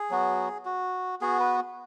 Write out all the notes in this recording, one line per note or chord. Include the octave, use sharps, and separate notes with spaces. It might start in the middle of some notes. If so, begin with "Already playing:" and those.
Already playing: G#4
F#3 B3 F#4
F#4
B3 F#4 G#4
B4